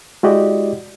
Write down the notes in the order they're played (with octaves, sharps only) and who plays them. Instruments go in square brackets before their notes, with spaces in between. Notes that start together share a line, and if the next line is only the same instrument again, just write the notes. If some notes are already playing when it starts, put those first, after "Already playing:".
[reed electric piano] G#3 E4 F#4 G4 D5 D#5